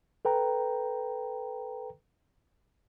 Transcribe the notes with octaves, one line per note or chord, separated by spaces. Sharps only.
A4 B4 G5 A#5